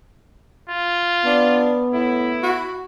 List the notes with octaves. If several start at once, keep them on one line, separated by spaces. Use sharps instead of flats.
F4
B3 D4
A2 E4
F#4